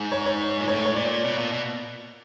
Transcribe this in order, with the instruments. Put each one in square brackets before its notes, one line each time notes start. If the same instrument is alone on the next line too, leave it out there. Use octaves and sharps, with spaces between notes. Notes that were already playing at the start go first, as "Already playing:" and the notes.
Already playing: [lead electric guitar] G#2
[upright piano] C#5
C#5
[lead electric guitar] A#2
[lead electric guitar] A2 [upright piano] C#5
[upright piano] C#5
[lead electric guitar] A#2 [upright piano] D5
[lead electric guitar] B2
A#2
B2